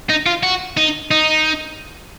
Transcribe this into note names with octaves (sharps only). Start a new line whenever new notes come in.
D#4
F4
F#4
D#4
D#4